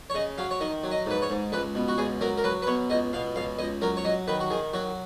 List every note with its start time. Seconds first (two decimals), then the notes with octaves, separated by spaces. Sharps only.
0.10 C#5
0.14 C#3 D#5
0.38 F#3 F5
0.51 C#5
0.60 D#3 D#5
0.84 F#3
0.91 D#5
1.06 G#2 B4
1.22 C#5
1.30 G#2
1.52 C#2 B4
1.75 B2
1.88 F#4
1.98 C#2 G#4
2.21 F#3 A#4
2.37 A#4
2.44 F#3 B4
2.62 B4
2.67 B2 C#5
2.90 C#2 D#5
3.13 B2 F5
3.36 C#2 F5
3.59 C#2 D#5
3.82 F#3 A#4
3.97 C#5
4.04 F#3 D#5
4.28 D#3 B4
4.40 F#4
4.50 D#3 G#4
4.73 F#3 F#4